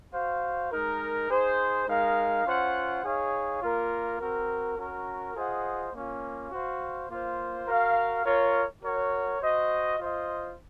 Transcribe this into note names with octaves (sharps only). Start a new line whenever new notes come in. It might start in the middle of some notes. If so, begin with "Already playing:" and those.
F#4 C5 F5
G#3 D#4 A#4
D#4 G#4 C5
G#3 D#4 A#4 F5
C#4 F4 C5 F#5
D#4 G#4 C#5 F5
A#3 F4 A#4
C4 F#4 A#4
C#4 F#4 A#4
F4 G#4 C5 D#5 F#5
A#3 C#4 F4
F#4 C5 F5
A#3 F4 C5
F#4 A#4 F5
F4 A#4 C#5
F#4 A#4 C#5 F#5
F#4 C5 D#5
F4 C5 D#5